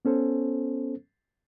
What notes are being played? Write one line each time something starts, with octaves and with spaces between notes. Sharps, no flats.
B3 C#4 A4 C5